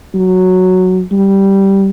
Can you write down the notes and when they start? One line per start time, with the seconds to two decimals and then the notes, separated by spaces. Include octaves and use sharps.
0.15 F#3
1.11 G3